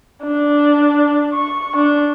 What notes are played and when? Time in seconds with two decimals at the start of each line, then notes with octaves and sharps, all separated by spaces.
0.24 D4
1.34 C#6
1.76 D4